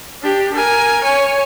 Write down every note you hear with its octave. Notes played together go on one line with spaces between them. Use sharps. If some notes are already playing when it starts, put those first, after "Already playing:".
D4 G4
A#4 G#5
C#5 G#5